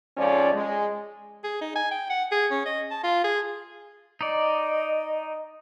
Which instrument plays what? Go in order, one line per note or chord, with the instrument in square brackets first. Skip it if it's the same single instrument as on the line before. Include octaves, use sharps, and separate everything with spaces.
[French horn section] F2 G#2 F3 C#4 D5
G#3
[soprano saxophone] G#4
D#4
G#5
G5
F#5
G#4
C#4
D#5
A5
F4
G#4
[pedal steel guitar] D#4 D5 [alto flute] D#5